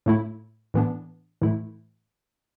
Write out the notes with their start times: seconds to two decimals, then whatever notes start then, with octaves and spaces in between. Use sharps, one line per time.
0.06 A2 A3 E4
0.74 A2 E3 B3 D4
1.41 A2 E3 A3 E4